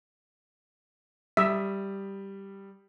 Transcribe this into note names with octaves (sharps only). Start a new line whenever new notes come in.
G3 E5 D#6 B6